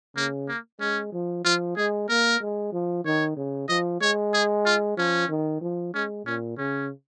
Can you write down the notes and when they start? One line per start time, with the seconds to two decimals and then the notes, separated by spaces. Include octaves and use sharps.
0.16 C#3 A#3
0.48 A#3
0.80 G#3 C#4
1.13 F3
1.44 F3 F4
1.76 G#3 G#4
2.08 A#3 A#4
2.41 G#3
2.73 F3
3.04 D#3 C#5
3.37 C#3
3.68 F3 D#5
4.01 G#3 C#5
4.33 G#4
4.65 F4
4.97 F3 C#4
5.29 D#3
5.61 F3
5.94 G#3 C#4
6.25 A#2 C#4
6.58 C#3 C#4